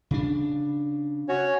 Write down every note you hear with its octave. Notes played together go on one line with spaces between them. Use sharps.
C#3 D4
C#4 F#4 C#5